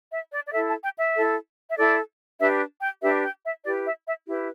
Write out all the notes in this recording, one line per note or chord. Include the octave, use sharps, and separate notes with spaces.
E5
D5
D5
E4 A4 E5
A5
G5
E5
E4 A4
E5
E4 A4 D5
D4 G4 B4 E5
G5
D4 G4 B4 E5
G5
E5
E4 G4 B4 D5
E5
E5
E4 G4 B4